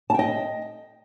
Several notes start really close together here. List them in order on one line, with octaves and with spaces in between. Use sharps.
A5 G5 D#5